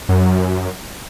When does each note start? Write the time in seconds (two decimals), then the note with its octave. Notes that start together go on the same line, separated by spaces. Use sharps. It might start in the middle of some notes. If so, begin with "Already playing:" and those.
0.09 F#2